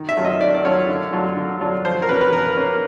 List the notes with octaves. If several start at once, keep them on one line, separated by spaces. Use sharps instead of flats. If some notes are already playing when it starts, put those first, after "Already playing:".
Already playing: D#3
E5
F#3 A3 C#4 F4
D#5
D#3 D5
D5
F#3 A3 C#4 F4 C#5
D3
F#3 A3 D4 F4
D3
F#3 A3 D4 F4
F3 C5
A#4
A#3 C#4 B4
B4
F3 A#4
A#3 C#4